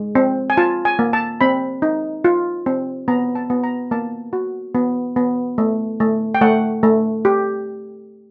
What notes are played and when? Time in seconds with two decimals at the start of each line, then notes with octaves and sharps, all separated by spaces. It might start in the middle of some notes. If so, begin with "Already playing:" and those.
Already playing: G#3
0.15 C4
0.50 G#5
0.57 F4 A5
0.85 G#5
0.99 A#3
1.13 A5
1.41 C4 B5
1.82 D#4
2.24 F4
2.66 C4
3.08 B3 A#5
3.35 A5
3.50 B3
3.64 A#5
3.91 A#3 A5
4.33 F#4
4.75 B3
5.16 B3
5.58 A3
6.00 A3
6.35 G5
6.41 A3 F#5
6.83 A3
7.25 G4